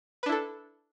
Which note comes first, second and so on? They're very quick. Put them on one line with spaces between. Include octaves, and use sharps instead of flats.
B4 D4 E4 A4